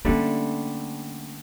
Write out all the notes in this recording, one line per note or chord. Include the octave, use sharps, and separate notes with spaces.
D3 G3 A3 A#3 C#4